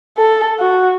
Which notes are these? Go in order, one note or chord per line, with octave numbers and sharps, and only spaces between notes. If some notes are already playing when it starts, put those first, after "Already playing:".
A4
F#4